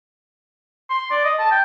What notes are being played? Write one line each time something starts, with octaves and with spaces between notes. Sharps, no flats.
C6
D5
D#5
A5
G5